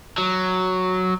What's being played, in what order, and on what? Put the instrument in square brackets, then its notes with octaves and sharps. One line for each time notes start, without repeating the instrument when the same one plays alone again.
[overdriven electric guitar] F#3